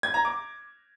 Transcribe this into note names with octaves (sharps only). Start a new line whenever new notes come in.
G#6
A#5
D6